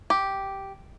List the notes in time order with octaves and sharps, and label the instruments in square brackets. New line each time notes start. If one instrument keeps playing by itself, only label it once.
[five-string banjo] G4